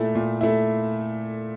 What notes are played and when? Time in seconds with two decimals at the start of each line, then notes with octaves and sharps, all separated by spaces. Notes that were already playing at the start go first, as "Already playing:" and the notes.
Already playing: A#2 A3 E4
0.15 A#2
0.41 A3 E4